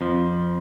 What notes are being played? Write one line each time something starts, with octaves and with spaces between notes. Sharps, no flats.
F2 F3